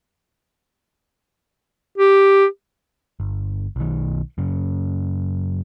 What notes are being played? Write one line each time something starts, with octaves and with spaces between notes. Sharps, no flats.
G4
G1
B1 D#3
F#2 C#3